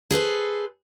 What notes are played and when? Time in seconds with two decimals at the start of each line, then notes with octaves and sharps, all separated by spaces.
0.11 G#4 A4 B4 C5